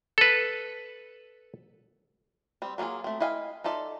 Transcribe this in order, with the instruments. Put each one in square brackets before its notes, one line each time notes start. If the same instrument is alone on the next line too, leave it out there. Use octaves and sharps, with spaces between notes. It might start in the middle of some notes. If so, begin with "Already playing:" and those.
[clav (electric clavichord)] A4 B4
[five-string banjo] G3 C4
F#3 A#3 C#4 F4 G#4
A3 C4
E4 D#5 F5 G5 G#5
D#4 F4 A4 D5 E5